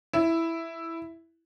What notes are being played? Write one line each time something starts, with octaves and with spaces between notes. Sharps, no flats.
E4